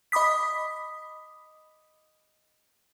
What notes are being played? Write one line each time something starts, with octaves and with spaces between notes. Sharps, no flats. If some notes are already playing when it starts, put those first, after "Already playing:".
D#5 B5 D6 D#6 B6